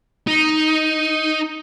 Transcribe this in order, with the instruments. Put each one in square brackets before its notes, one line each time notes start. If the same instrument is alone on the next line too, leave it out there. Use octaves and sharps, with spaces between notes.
[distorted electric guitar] D#4